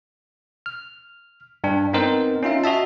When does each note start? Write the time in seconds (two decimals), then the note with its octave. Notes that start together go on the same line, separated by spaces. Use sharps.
0.66 F6
1.64 G2 D4
1.93 B3 C4 D#4 A#4 C5
2.43 C#4 D#4 F4 E5
2.64 F#4 D#5 E5 A5